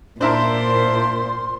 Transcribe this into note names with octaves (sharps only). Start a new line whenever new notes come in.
A#2 D4 E4 A#4 C5 C6